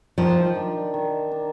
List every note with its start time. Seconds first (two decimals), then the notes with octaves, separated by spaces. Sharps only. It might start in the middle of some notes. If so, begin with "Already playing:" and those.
0.18 D#3 F3
0.55 D4
0.94 D#3
1.32 D4